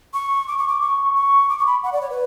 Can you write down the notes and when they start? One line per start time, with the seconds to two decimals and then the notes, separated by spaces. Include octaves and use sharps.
0.14 C#6
0.47 D6
0.58 C#6
0.68 D6
0.81 C#6
1.15 C#6
1.49 D6
1.58 C#6
1.66 B5
1.83 F#5
1.93 D5
2.01 C#5
2.10 B4